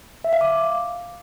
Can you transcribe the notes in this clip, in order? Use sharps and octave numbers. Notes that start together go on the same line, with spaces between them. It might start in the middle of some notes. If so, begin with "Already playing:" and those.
E5
F5
D6